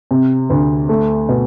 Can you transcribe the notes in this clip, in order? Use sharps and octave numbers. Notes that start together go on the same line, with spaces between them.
C3
D2
A3
B2